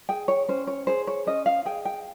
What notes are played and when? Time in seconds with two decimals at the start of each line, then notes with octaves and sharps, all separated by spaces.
0.09 G#4 G5
0.28 C#5
0.49 C#4 C5
0.67 C#5
0.87 G#4 C5
1.07 C#5
1.27 C#4 D#5
1.46 F5
1.65 G#4 G5
1.85 G5